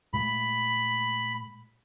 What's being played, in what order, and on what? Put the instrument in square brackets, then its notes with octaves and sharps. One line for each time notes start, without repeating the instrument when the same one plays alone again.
[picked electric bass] A#2 G#3 A3 [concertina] B5